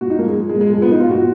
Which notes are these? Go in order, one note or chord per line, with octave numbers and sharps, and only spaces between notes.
A#2 F#4
D#4
F3 A#3
G#3
F3
G#3
A#2
G#3
F3 G#3
B3
F3 D#4
F4
A#2 F#4